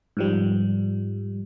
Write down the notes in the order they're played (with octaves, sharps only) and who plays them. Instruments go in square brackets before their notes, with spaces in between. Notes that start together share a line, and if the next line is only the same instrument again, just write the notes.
[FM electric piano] G#2 F3 G3